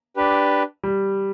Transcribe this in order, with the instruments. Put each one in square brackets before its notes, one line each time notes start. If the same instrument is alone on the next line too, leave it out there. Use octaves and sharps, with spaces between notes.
[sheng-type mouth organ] D4 G4 B4
[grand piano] G3